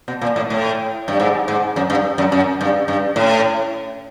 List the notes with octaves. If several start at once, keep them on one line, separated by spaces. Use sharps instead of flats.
B2
A#2
A2
A2
G2
G#2
G#2
F#2
G2
F#2
F#2
G2
G2
A2